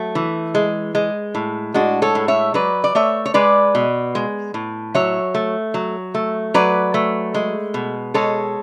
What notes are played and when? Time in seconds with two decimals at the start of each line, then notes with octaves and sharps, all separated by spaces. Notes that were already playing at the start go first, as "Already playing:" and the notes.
Already playing: F#3 A3
0.15 E3
0.55 G#3
0.95 G#3
1.35 A2
1.74 G#3 D4 F#4
2.02 A4 C#5
2.15 A2
2.28 C#5 E5
2.54 F#3 B4 D5
2.84 D5
2.95 A3 C#5 E5
3.26 C#5
3.34 G#3 B4 D5
3.75 B2
4.15 G#3
4.54 A2
4.95 F#3 C#5 E5
5.34 A3
5.74 F#3
6.15 A3
6.54 F#3 B4 D5
6.94 A3
7.34 G#3
7.74 B2
8.14 G#3 A4 C#5